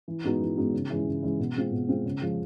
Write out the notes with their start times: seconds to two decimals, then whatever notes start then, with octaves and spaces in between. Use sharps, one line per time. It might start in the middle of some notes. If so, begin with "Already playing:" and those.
0.08 E3
0.24 G#3 B3 D#4 F#4
0.41 E3
0.57 G#3 B3 D#4 F#4
0.73 C#3
0.90 E3 G#3 C#4 E4
1.06 C#3
1.22 E3 G#3 C#4 E4
1.40 B2
1.56 G#3 C4 F4
1.73 B2
1.88 G#3 C4 F4
2.06 C#3
2.22 F3 G#3